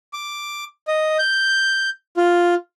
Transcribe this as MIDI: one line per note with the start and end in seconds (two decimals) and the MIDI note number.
0.13 0.64 86
0.88 1.18 75
1.19 1.89 91
2.17 2.54 65